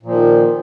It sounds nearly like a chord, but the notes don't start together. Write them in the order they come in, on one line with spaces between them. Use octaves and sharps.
A#2 F3 D#3